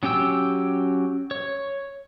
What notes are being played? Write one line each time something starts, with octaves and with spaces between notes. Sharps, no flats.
F#3 C#4 G4 G5 E6
C#5